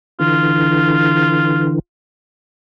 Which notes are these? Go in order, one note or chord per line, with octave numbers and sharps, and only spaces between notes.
D3 E3 F4